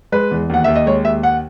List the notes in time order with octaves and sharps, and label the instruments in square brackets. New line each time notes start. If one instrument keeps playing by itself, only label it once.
[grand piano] G#3 B4
E2
D#2 F#5
D#2 E5
D#5
G#3 C#5
D#2 E5
F#5